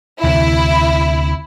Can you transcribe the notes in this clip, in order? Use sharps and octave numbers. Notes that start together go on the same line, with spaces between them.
D2 C3 E3 E4